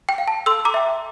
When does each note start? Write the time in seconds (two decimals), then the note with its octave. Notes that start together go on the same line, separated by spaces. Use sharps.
0.09 G5
0.18 F5
0.28 A5
0.46 A4 C6 E6
0.65 A#5 D6
0.74 E5 G5